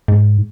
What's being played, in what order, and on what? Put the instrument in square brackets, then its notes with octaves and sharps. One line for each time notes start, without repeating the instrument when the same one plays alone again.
[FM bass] G#2